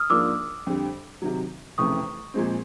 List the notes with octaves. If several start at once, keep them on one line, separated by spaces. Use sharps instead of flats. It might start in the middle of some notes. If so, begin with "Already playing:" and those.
Already playing: D#6 F6
G#2 F3 A#3 D4 D6 E6
F2 D3 G3
C3 D#3 F#3
F1 F2 C#3 E3 A3 C#6 D#6
A#2 F3 G#3 C4